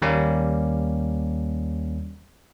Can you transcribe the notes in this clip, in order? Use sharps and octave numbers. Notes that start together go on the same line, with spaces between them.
D#2 G3 A#3 C#4